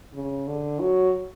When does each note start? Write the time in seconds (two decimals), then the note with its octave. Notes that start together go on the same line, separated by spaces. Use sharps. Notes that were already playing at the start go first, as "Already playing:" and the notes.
0.14 C#3
0.47 D3
0.80 F#3